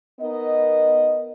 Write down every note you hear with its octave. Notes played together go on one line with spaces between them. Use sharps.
B3 D#4 A#4 D#5